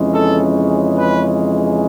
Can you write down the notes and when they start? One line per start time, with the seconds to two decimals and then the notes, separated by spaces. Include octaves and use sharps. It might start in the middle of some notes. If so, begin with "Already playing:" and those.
Already playing: F2 C#3 E3 G#3 C#4
0.15 A4
0.98 B4